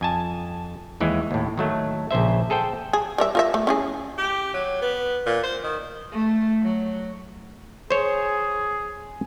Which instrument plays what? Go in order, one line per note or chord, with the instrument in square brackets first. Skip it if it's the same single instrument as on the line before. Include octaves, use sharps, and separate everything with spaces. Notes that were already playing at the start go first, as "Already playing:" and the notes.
[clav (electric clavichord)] F2 G#5 A5
D#2 E3 G#3
D#2 A2
D#3 F#3 A3
A#1 C#3 C5 E5
G#4 A4 C5 G5
[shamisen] G#4
G3 A#4 E5
F4 A#4 E5
A3
C#4 E4 G#4
[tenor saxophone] G4
F#3
B3
A#2
C5
D#3
[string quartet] A3
F#3
[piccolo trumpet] G#4 [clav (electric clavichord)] C5 C#5